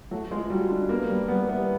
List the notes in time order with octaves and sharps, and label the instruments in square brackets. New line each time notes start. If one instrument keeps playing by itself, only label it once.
[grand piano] F#3 [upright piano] A3
[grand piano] G#3 [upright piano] F4
[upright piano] F#3 [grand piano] G3
[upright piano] D4
[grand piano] A#3 [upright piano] B3
[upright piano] G3
[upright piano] G3 [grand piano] B3
[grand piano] B3 [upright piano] E4